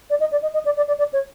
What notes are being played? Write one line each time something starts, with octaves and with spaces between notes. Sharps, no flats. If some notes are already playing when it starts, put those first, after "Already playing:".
D5
D#5
D5
D#5
D#5
D5
D5
D5
D5
C#5